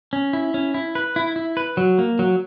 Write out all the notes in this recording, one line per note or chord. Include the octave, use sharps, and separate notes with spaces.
C#4
E4
C#4
E4
B4
E4
E4
B4
F#3
A#3
F#3